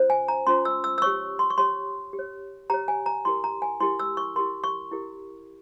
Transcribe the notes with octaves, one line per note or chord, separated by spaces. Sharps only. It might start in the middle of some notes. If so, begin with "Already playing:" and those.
Already playing: C#4 F4 C5
G#5
A#5
C#4 F4 C5 C6
E6
E6
E6
G4 C#5 C#6
C6
C#6
G4 C#5 C6
G4
C#5
G4 C#5 A#5
G#5
A#5
E4 G4 A#4 C6
A#5
G#5
E4 G4 A#4 C6
E6
C#6
E4 G4 A#4 C6
C#6
E4 G4 A#4